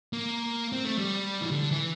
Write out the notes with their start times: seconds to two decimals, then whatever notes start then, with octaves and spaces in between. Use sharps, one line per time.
0.13 A#3
0.73 C4
0.85 A3
0.98 G3
1.41 E3
1.51 D3
1.71 E3